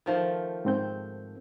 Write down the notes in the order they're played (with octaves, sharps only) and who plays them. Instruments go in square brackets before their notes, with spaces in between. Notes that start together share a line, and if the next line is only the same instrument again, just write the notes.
[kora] D#3 F3 A3
[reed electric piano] G#2 C4 G6